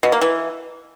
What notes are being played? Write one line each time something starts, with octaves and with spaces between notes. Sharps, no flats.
B2
A#3
E3